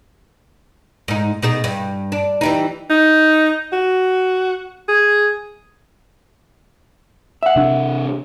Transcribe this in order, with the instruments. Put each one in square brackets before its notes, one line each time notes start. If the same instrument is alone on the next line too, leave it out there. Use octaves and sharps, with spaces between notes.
[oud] G#2 D#4
B2 D#4 G#4
G2
D4
E3 G3 D#4
[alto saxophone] D#4
F#4
G#4
[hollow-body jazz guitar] E5 F#5
[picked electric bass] C3 D4